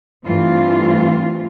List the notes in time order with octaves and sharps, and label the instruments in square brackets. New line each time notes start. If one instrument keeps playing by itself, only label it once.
[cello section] G2 E3 A3 C4 F4